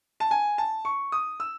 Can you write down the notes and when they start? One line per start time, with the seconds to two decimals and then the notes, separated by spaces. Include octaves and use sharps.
0.20 A5
0.31 G#5
0.58 A5
0.85 C#6
1.12 D#6
1.40 E6